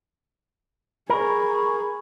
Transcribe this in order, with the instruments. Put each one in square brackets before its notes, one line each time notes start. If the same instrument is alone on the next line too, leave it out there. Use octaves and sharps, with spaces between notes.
[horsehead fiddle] G#4 [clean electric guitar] A#4 [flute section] B5 C#6